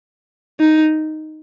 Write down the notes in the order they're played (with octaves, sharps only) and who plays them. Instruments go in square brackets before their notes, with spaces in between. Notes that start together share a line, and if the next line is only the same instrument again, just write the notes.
[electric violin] D#4